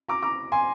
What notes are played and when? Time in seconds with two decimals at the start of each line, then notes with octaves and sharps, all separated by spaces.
0.08 A#5 D6
0.22 A#5 D6
0.52 G#5 C6